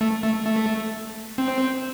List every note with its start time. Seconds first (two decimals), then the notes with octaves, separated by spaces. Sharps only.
0.01 A3
0.24 A3
0.46 A3
1.38 C4